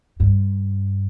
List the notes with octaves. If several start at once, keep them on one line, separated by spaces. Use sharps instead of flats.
G2